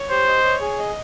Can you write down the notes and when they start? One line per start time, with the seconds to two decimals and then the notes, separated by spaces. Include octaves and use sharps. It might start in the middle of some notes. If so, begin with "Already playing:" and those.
Already playing: C#5
0.11 G4 C5
0.28 D#5
0.44 C#5
0.61 G#4
0.79 D#5